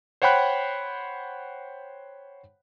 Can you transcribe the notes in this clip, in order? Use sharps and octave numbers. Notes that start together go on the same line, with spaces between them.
C5 C#5 F#5 G5 B5 F#6